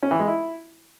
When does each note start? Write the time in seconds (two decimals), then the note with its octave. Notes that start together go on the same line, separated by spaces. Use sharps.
0.03 C#4
0.11 E3
0.19 G#3
0.28 E4